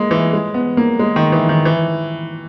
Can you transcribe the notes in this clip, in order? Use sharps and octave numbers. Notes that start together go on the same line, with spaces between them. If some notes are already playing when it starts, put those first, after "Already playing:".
Already playing: G#3 A#3
E3
G#3
B3
A#3
G#3
D#3
E3
D#3
E3